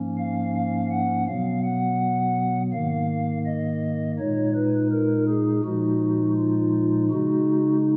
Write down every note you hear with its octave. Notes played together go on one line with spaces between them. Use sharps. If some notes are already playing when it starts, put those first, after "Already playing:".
Already playing: G#2 F3 A#3 C#4
F5
F5
F#5
B2 F#3 B3 F5
F#5
G#2 D#3 A#3 F5
D#5
A#2 G#3 D#4 C#5
B4
A#4
G#4
A#2 F3 G#3 D#4 F#4
F4
C#3 G#3 D#4 F#4